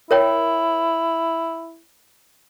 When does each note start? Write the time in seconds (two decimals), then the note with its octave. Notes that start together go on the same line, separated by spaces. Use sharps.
0.11 E4 A#4 C#5 G5